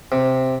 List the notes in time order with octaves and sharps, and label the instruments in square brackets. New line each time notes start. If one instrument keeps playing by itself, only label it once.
[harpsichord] C3